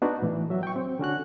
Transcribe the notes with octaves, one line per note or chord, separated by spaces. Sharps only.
B3 D4 D#4 F#4
A2 E3
F#3 E5
G5 C#6
C4
D3 C#4 F#4 F#6